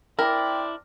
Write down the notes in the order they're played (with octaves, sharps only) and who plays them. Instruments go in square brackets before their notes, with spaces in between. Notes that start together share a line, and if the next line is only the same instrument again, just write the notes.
[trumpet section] C4 D4 D5 [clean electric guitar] E4 [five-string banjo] A#4 [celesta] G5